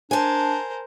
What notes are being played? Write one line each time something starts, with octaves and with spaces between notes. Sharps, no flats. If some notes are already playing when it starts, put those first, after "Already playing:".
D4 A#4 C5 G#5 A5